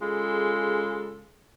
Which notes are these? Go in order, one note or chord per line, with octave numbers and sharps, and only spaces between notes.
C#3 G#3 F4 A4